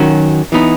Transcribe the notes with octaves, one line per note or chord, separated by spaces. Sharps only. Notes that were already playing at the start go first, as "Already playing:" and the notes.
Already playing: D#3 F#3 C#4 F#4
E3 B3 D#4